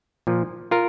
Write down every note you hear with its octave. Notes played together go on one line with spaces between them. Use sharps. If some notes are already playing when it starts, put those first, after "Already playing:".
A#2 F3
F4 A#4